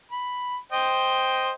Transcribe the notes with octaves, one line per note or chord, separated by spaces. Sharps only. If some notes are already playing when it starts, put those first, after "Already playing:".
B5
C5 D#5 G5